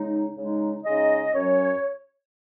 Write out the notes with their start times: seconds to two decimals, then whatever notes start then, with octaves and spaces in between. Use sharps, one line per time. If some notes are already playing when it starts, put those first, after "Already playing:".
Already playing: C#3 G#3 D#4
0.36 C#3 G#3 D#4
0.84 C#3 G#3 D#4 D#5
1.34 F#2 F#3 C#4 C#5